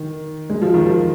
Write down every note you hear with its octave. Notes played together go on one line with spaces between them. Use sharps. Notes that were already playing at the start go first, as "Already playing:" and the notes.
Already playing: D#3
G#3
F3
D#3
F3